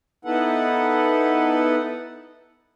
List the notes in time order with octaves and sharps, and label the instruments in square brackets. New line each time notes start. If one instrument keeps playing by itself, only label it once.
[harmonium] B3 D#4 E4 A4 B4 F#5